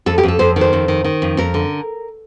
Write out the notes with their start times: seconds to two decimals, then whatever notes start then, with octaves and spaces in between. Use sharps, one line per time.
0.06 F2 A4
0.18 G4
0.23 F2 A4
0.39 F2 C5
0.56 D#3 C5
0.73 F2
0.88 D#3
1.04 D#3
1.22 F2
1.37 F2 A#4
1.54 D3